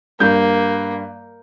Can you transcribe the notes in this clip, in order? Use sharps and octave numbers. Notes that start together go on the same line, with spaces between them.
G2 A#3 G6